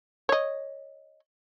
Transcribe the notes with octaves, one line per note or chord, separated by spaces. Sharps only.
C#5 D#5